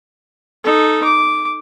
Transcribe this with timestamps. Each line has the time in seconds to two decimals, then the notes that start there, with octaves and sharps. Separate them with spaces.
0.64 D#4 A4
1.04 D6